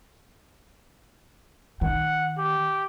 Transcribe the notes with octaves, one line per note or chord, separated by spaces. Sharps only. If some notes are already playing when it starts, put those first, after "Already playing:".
D#3 F#5
G4